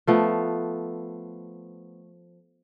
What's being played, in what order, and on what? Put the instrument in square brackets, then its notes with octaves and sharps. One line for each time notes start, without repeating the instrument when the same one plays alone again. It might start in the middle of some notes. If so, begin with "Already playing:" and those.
[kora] F3 A3 B3